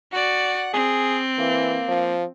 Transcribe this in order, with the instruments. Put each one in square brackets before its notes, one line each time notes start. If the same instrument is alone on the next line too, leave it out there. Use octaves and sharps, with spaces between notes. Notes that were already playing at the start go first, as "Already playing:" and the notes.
[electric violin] F#4 D5 [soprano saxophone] F#5
[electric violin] C4 [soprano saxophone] G#4
[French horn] E3 [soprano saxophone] A#3
[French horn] F3